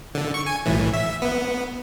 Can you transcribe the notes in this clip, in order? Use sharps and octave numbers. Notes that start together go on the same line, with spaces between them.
D3
C#6
G#5
B1 A2 E3
E5
B3